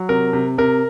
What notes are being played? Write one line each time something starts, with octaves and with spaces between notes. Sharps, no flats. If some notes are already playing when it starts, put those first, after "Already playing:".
Already playing: F#3
C3 A#4
C3
C3 A#4